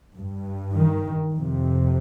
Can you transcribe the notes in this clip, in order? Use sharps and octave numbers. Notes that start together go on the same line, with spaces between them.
G2
D#3
F2 C3